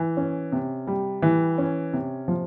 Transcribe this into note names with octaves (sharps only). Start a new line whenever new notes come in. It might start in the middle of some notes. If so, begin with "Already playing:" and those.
Already playing: E3
C#4
C3
G3
E3
C#4
C3
F3